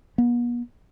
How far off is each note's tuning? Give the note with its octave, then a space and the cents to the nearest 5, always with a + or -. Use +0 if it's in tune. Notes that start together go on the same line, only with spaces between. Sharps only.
B3 -45